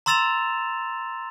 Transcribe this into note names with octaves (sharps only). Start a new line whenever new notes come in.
A#5 C6 E6 A6 E7 F7